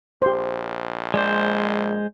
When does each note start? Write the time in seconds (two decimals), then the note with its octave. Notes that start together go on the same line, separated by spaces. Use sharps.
0.22 A#1 G4 C5
1.14 G#3 C5 D5